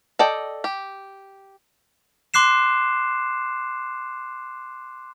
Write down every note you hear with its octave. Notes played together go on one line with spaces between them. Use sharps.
A4 D5 D#5 G5
G4
C6 D6 F#6 C7 E7